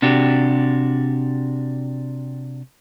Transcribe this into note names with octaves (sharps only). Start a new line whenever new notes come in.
C3 D4 F#4 G4